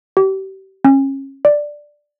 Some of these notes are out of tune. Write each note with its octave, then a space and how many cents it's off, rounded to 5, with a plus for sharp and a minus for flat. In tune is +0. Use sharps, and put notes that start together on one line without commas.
G4 -35
C#4 -30
D5 +5